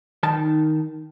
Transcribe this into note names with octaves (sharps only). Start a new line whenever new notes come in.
D#3 D#4 A5